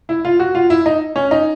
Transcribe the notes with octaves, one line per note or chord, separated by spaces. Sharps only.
E4
F4
F#4
F4
E4
D#4
C#4
D#4